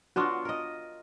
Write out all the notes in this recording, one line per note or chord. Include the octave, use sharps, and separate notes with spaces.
B3 D4 F4 F#4
A#4 D#5